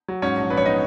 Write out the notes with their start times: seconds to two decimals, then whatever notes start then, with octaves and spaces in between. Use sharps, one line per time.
0.08 F#3
0.22 G#2 C#4 C#5
0.38 A#1
0.50 A#1 B4
0.57 C#5
0.66 B3 D#4 D#5